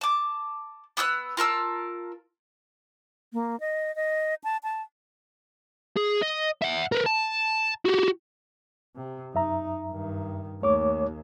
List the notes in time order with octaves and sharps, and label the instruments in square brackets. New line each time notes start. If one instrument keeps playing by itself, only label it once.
[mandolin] A5 D6
B3 D#6 E6 F#6
F4 A#4 A5 E6
[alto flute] A#3
D#5
D#5
A5
A5
[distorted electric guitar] G#4
D#5
E5 F#5
A#4 B4
A5
F#4 G4
[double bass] C3
[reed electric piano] F#2 E5 A#5 [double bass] D#4
[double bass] G2 D#3
[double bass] D#2 [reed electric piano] A3 C#5 D6